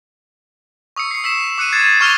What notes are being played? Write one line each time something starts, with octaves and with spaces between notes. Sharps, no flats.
C#6 D#6 E6 C#7
C7 C#7
E6 B6 E7
D6 F#6 C#7 D#7
G#6 A6 C7
C#6 D6 F6 D#7 F7 G7